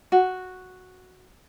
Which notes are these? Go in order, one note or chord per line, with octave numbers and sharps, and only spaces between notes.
F#4